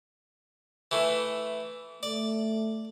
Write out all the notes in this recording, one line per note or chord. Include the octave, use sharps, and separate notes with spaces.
E3 A3
A3 D5